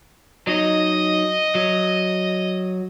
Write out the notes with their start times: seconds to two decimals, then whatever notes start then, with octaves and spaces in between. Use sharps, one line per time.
0.47 F#3 D#4 D#5
1.55 F#3